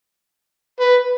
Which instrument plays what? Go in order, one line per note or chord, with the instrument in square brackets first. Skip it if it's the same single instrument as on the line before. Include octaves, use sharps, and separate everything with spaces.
[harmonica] B4